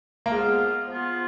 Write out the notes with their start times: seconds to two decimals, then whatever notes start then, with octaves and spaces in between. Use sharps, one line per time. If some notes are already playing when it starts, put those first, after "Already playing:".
0.26 A#3
0.31 F3 G#3 B3 F4
0.87 F3 B3 F4